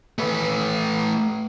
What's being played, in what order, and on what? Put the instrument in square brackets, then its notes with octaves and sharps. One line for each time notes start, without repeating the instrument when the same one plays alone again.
[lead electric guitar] A3 B4